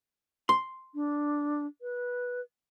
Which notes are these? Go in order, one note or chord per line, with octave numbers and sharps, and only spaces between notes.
C6
D4
B4